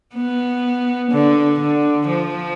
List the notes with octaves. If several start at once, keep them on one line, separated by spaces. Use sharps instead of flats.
B3
D3
D3
F3